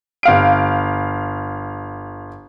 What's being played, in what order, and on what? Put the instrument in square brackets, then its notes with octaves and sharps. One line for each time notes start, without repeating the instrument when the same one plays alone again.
[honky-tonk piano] G1 F5 D7